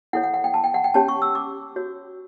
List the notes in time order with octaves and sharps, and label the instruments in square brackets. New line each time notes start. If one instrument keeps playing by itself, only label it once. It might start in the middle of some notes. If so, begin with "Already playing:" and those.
[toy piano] E4 A4 C#5 F#5
F#5
F#5
G5
A5
G5
F#5
G5
C#4 G4 C#5 A5
C#6
E6
D6
F#4 C#5